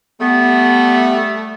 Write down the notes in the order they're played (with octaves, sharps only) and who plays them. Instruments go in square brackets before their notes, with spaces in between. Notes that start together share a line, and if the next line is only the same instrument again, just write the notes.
[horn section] G3 A3 [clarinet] B3